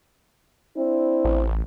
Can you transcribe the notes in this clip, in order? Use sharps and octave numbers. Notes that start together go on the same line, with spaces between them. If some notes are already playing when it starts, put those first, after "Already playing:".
C4 D4 E4
A1